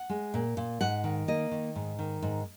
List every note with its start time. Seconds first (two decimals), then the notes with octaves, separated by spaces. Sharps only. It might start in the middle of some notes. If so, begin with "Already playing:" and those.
Already playing: F#5
0.10 G#3
0.34 A#2
0.57 A#2
0.81 G#2 F#5
1.04 D#3
1.28 A#3 D#5
1.51 D#3
1.75 G#2
1.99 D#3
2.22 G#2